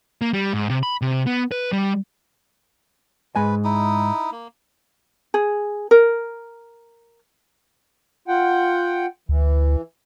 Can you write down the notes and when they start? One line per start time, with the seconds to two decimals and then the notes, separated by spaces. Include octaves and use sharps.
0.21 A#3
0.33 G3
0.53 G#2
0.70 C3
0.83 B5
1.02 C3
1.26 B3
1.52 B4
1.72 G3
3.36 G#2 G#3 B4 G#5
3.64 D#4 E4 D#6
4.32 A#3
5.34 G#4
5.91 A#4
8.28 F4 F#5 G5
9.29 D2 E3